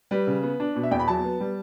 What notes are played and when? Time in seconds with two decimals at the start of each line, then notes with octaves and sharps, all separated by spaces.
0.11 G3 B4
0.27 C#3
0.43 B3
0.60 D4
0.76 B2
0.83 E5
0.91 E2 G5
1.00 B5
1.08 F#3 A5
1.24 B3
1.40 G3